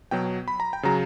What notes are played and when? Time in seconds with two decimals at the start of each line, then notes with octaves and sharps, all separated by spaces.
0.11 B2 F#3 G5
0.48 B5
0.60 A#5
0.73 G5
0.83 C#3 F#3 A#5